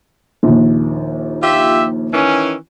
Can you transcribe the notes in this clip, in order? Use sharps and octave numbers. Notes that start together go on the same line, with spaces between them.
A#1 D#2
F4 G4 E5
D#3 E3 C#4